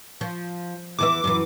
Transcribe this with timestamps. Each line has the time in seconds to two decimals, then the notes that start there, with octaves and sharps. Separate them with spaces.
0.21 F3
0.99 E2 E3 E5 D6
1.24 F#2 E3